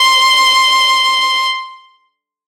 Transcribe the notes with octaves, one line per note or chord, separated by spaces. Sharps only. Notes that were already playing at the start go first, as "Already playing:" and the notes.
Already playing: C6